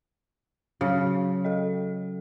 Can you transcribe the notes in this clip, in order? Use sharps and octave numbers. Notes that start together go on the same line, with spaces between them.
C#3 F#3 C#5 F5
A4 D#5